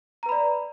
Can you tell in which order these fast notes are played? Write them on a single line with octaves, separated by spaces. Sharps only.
A#5 B4 B5 D5